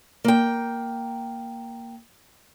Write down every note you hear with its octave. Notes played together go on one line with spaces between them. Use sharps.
A#3 G5